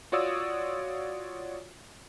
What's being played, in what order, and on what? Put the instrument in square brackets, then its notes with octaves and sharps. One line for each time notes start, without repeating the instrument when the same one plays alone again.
[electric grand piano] F4 F#4 C#5 D5 D#6 E6